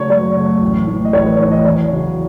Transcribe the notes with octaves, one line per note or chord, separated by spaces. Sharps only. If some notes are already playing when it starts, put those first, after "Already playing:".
Already playing: C#3 F#3 A3 C#5
F#2 C#5
C#3 F#3 A3
A1
A2 E3 A3
D#5
A1 C#5
B4
A2 E3 A3 C#5
D#5
E2 C#5
C#3 F#3